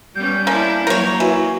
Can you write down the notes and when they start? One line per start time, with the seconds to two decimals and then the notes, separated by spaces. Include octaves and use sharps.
0.15 G3 B3 C#4 G6
0.47 A#3 C#4 D4 E4
0.87 F#3 A#3 A#4 C#5
1.20 E3 F#4